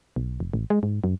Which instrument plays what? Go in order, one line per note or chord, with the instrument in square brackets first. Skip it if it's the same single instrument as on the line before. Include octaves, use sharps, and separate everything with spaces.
[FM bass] B1
F1
A1
G#3
G#2
F#2